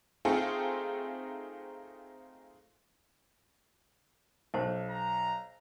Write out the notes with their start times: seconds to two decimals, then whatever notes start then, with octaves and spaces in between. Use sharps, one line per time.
0.25 A3 C4 D#4 F4 G#4 A4
4.54 B1 C5 A5
4.90 A#5